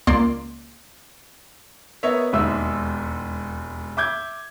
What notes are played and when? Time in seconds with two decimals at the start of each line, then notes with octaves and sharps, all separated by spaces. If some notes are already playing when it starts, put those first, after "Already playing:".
0.07 C#2 A#3 D5 C6
2.03 B3 A#4 C#5 D#5 E5
2.33 E1 D#2 G#3 E5 E6
3.97 E5 D6 G6 G#6